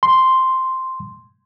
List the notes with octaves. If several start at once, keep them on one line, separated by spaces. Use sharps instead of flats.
C6